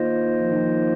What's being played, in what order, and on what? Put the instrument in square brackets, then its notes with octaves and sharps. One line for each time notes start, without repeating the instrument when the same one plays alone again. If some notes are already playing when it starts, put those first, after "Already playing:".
Already playing: [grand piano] D#3 [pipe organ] A#3 F4 C5 D#5
[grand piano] F3
D#3
F3